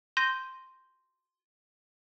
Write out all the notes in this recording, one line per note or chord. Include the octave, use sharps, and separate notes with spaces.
C6 G6 A#6 D#7